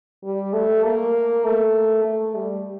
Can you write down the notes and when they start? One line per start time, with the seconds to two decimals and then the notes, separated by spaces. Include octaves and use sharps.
0.24 G3
0.53 A3
0.84 A#3
1.44 A3
2.05 A3
2.35 G3